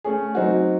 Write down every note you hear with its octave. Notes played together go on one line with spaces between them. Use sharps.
A3 C#4 G#4
F#3 C4 D#4 F#4